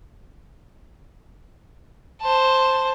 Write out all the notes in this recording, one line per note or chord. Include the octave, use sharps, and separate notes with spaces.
C5 A5